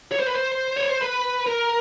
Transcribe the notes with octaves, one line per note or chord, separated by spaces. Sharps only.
C#5
C5
B4
C5
C#5
C5
B4
A#4